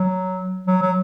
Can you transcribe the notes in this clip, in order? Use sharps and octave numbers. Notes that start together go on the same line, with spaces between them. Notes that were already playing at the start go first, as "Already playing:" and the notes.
Already playing: F#3
F#3
F#3